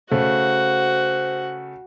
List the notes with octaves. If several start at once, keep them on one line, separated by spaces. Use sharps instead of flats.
C#3 A3 F#4 C5 F#5